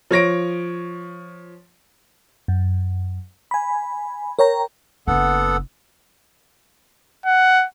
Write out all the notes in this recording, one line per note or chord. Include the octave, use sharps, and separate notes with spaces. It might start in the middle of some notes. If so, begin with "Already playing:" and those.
F3 C#5 A#6 D7
F#2
G#5 B5
A#4 C#5 G5 A#5
F#1 B3 A4 F#5
F#5